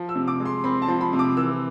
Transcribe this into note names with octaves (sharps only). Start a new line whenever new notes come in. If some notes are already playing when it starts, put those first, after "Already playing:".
Already playing: F3
E6
C3
D6
G#3
C6
C4 B5
A5
F3
B5
C3
D6
E3 E6